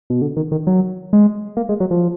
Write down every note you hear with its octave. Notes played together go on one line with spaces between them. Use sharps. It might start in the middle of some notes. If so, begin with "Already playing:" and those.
B2
D3
D#3
D#3
F#3
G#3
A#3
G#3
F#3
F3